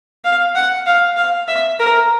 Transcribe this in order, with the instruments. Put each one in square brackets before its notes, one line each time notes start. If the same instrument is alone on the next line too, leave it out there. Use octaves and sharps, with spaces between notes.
[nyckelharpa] F5
F#5
F5
F5
E5
A#4